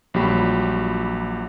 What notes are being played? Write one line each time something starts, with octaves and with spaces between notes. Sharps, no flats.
A#1 F#3 G3 G4 B5 C#6